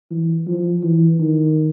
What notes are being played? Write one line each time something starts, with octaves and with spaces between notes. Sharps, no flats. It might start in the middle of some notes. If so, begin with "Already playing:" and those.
E3
F3
E3
D#3